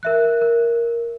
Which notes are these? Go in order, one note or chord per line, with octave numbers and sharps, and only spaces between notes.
A#4 E5 F#6
A#4